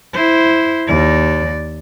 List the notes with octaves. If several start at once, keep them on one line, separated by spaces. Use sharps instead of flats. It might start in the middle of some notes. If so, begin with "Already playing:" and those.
E4 C5
D#2 D5